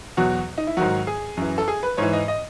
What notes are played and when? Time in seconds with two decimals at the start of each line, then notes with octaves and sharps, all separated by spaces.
0.17 E2 B2 F#3 F#4
0.58 D#4
0.67 E4
0.77 G#2 D#3 F#3 F#4
1.07 G#4
1.37 F#2 E3
1.58 A4
1.68 G#4
1.83 B4
1.97 G#2 E3 C#5
2.13 D#5
2.28 D#5